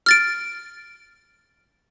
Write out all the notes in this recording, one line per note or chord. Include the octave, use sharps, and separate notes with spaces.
F6 A6 D7